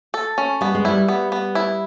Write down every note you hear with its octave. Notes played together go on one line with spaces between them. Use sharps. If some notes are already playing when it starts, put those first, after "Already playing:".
A4
C#4
G3 B3
G#3
G3 E4
B3
B3
E4